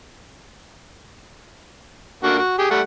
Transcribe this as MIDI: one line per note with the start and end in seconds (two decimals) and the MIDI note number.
2.23 2.37 50
2.23 2.37 58
2.23 2.37 66
2.38 2.55 66
2.59 2.66 67
2.59 2.66 68
2.71 2.80 55
2.71 2.80 57
2.71 2.80 78